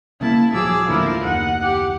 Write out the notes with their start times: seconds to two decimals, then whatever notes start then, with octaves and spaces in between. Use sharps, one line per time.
0.21 C#3 A3 A#3 E4 A5
0.53 D#1 F3 F#3 G#4 D6 E6
0.88 D#2 A2 D3 F3 E4 A#4
1.23 F#1 D#2 D#4 F#5
1.62 G4